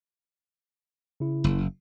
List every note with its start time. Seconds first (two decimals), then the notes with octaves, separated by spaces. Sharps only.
1.20 C#3 E4
1.44 F#1